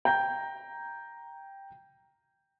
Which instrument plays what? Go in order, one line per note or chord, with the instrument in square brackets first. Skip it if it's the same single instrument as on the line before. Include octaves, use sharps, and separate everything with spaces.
[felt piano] G5 A#5 G6